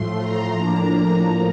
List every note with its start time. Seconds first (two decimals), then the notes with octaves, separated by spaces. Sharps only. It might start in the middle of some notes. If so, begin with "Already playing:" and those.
Already playing: A2 F3 A3 C6
0.17 A#5
0.50 A2 F3 A#3 D4
1.19 A2 F3 A#3